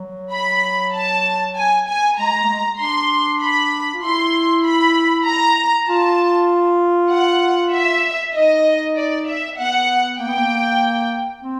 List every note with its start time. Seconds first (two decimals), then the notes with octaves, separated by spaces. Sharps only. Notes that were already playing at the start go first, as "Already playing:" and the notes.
Already playing: F#3
0.33 B5
0.94 A5
1.56 G#5
1.87 G#5
2.18 G#3 A#5
2.33 G#3
2.43 A3
2.49 G#3
2.79 D4 C6
3.41 B5
3.94 F4
4.02 E4 C6
4.64 B5
5.26 A#5
5.88 F4 A5
7.10 F#5
7.73 E5
8.34 D#4 D#5
8.96 D5
9.27 E5
9.58 B3 F#5
10.19 A#3 G5
10.28 B3
10.36 A#3
11.42 C4